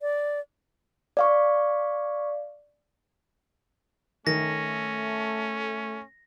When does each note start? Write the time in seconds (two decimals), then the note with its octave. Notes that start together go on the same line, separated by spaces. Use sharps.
0.01 D5
1.17 D5 F5 C#6
4.27 D#3 A3 C#4 A#6